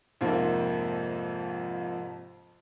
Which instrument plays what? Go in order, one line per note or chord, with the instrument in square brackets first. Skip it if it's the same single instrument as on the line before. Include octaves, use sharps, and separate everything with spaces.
[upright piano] F2 G#2 C3 F3 A#3